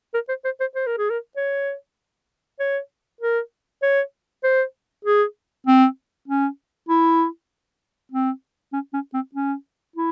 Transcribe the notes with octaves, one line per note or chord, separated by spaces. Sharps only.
A#4
C5
C5
C5
C5
A#4
G#4
A#4
C#5
C#5
A#4
C#5
C5
G#4
C4
C#4
E4
C4
C#4
C#4
C4
C#4
E4